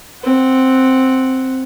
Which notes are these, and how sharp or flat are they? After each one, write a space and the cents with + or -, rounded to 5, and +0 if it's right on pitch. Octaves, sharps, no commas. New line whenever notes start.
C4 +0 F#5 +0